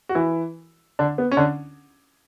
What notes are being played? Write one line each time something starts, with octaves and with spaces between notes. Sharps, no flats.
F#4
E3 E4
D3 D4
B3
C#4
D3 D4